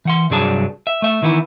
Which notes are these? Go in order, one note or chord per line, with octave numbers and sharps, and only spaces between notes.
E3 F#5 C6
C2 G2 F#3 D4 G#4 A5
E5
A3 E5
D#3 E3 B3 E4